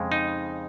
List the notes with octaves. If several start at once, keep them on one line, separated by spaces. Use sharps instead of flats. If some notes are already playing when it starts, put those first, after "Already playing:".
Already playing: F2 C#3 G#3
D#4